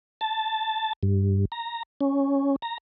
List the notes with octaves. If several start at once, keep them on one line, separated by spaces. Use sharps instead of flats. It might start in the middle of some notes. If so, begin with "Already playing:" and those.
A5
G2
A#5
C#4
A#5